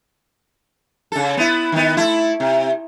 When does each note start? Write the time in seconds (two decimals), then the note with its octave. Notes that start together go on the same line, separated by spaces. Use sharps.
1.12 C#3 A4
1.37 B3 E4
1.72 D#3 B3
1.97 A3 E4
2.40 C3